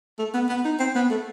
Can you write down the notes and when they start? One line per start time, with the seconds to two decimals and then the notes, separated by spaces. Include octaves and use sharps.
0.19 A3
0.34 B3
0.49 B3
0.65 D#4
0.80 C4
0.95 B3
1.10 A3